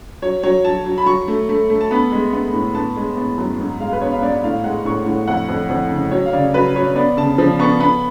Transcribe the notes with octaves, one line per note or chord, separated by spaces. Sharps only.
F#3 C#5
F#3 C#5
F#3 A5
F#3
B5
F#3 C#6
A3
A3
A3
A5
B3 B5
G#3
B3
A2
B3 A5
G#3
B3
F#2
G#2
G#3 F5
B4
B3 C#5
F5
G#2 D5
A2 F5
G#3 F#5
A2 C#6
A2
F2 F#5
F2
F2
C#3
F#3 C#5
F5
C#3 D5
F#3 B4
F#3 C#5
B3 D5
C#3 A5
F3
B3 C#6
B3 B5